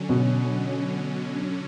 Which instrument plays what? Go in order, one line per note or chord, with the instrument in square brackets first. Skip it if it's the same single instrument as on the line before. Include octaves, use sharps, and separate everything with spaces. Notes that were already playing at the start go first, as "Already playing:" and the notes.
Already playing: [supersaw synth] D3 F#3 C#4
[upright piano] B2